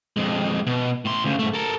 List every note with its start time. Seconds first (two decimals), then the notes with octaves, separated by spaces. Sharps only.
0.17 F2 G#3
0.67 B2
1.05 A2 C6
1.24 D2 C#3
1.39 G#2 A3
1.54 A4 A#4